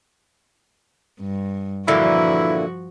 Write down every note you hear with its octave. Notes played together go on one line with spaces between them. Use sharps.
G2
A#2 D3 E3 F3 E4 F#4